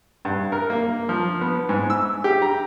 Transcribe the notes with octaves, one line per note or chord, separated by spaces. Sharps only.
G2
A#4
A#3
F3
B3
G#2
E6
G4
A#5